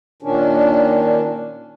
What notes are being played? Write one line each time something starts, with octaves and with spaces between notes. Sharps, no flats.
A#2 D#3 C#4 D4